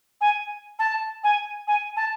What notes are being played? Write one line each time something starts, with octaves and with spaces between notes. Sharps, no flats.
G#5
A5
G#5
G#5
A5